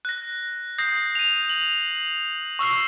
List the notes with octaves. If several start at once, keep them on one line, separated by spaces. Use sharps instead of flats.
F#6 A#6
D#6 G6 A#6 C7
D#7 F7
F#7
C#6 E6 F6 C7